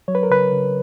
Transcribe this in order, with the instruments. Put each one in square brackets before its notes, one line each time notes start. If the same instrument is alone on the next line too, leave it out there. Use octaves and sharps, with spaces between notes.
[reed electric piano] F#3 C#5
B4
A#4
C#3 B4
C#3